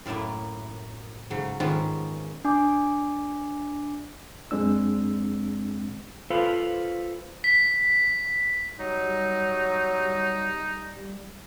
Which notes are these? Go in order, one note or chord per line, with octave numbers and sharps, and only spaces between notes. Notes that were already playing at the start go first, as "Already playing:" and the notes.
F#2 A2 A3 A#3 E4
G#2 C#3 F#3
G#2 D#3 F3 B3 C#4 F4
D4 G#5 D6
F#2 G#3 C4 D4 E6
F4 A4 B4 C5 F5
B6
F#3 G3 D#4